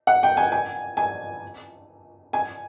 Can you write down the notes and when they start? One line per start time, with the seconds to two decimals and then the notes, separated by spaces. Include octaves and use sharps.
0.07 F#5
0.23 G5
0.37 G#5
0.52 G#5
0.97 G#5
2.33 G#5